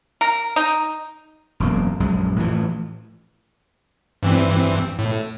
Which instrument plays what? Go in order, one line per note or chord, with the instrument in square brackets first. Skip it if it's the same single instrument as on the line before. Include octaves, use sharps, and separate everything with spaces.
[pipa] A#4
D#4
[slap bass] E1 F#2 A#3
A#1 F#2 G#3
A2 E3 F3
[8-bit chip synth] G2 E3 C4
A2